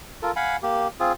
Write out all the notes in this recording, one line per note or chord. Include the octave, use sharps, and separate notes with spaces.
F4 A4 A#4
F5 F#5 G#5 B5
A#3 G4
C4 F4 G#4